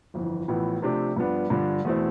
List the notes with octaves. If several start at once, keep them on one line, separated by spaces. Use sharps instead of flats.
G1 F2 E3
A1 A2 F3 B3
C3 F3 A3 D4 G4
G2 F3 B3 D4
G2 D3 F3
E2 B2 A3 C4 E4